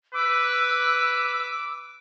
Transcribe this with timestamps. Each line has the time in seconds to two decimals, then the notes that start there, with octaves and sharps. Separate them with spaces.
0.14 B4 D6 E6